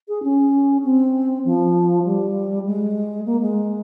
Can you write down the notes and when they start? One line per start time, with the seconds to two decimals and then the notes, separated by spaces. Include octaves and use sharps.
0.08 G#4
0.23 C#4
0.84 C4
1.45 F3
2.05 G3
2.66 G#3
3.26 A#3
3.41 G#3